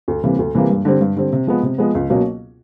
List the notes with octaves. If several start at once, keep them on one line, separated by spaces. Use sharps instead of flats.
D2
C3 E3 G3 A#3
D2
C3 E3 G3 A#3
G2
D3 G3 C4
G2
D3 G3 C4
C3
F3 G#3 B3
C3
F3 G#3 B3
C#2
B2 F#3 A#3 C#4